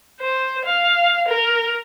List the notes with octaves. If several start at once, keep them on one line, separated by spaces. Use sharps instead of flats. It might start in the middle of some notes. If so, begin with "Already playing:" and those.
C5
F5
A#4